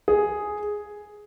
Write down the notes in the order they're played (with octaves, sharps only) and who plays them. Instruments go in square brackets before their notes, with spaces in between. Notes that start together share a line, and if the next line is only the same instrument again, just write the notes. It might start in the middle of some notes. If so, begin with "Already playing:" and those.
[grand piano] G#4